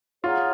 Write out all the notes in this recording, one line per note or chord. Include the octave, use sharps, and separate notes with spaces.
F4 G#4 C#5 F#5 A#5